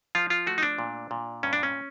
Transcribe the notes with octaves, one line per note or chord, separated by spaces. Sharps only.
F3 F4
F4
A3 F#4
D#4
D4
A#2
A#2
G2 C#4
D4
C#4